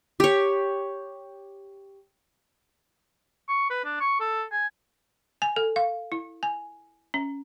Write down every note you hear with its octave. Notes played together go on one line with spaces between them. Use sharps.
G4 C#5
C#6
B4
D4
C#6
A4
G#5
G#5
A4
F5
E4
G#5
C#4